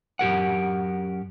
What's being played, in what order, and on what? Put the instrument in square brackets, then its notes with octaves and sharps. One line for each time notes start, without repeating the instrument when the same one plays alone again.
[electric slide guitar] F#2 G4 A#4 F#5